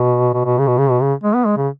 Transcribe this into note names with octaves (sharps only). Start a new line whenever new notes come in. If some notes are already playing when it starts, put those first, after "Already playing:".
Already playing: B2
B2
B2
C#3
B2
C#3
B2
C#3
G#3
B3
G#3
C#3